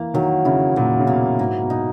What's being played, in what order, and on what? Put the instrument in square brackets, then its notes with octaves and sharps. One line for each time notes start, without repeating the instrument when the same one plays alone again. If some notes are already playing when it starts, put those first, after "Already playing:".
Already playing: [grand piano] E3 [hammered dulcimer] A#3
[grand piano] D#3 [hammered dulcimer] F#3
[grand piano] C#3 [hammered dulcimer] E4
[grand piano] A#2 [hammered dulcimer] F#3
[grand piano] C#3
[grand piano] B2 [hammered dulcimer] A#3
[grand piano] G#2 [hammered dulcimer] A#3
[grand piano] B2
[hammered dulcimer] D#4